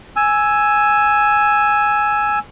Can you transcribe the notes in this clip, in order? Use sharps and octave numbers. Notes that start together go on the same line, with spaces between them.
G#5 E6